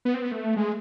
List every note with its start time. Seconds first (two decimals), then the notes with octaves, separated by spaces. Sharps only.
0.05 B3
0.14 C4
0.22 B3
0.31 A3
0.57 G#3